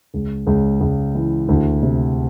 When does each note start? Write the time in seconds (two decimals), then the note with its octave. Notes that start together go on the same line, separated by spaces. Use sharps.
0.14 C#2
0.47 C#2
0.81 C#2
1.15 E3
1.49 D2
1.82 C3